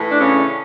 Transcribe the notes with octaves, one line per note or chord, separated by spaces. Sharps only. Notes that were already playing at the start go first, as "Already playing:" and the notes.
Already playing: A2 E3
D4
C#3 C#4